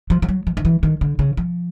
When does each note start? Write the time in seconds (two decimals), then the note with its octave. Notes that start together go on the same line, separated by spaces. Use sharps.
0.10 F3
0.22 F3
0.29 F#3
0.47 F3
0.57 D#3
0.65 E3
0.83 D#3
1.01 D3
1.19 C#3
1.37 F3